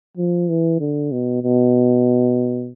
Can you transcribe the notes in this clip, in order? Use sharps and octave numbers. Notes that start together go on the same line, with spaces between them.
F3
E3
D3
B2
B2